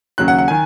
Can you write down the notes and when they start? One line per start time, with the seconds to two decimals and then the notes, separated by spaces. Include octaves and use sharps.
0.18 D#2 C#3 F#3 F#6
0.28 F#5
0.38 F#5
0.48 D#3 G#5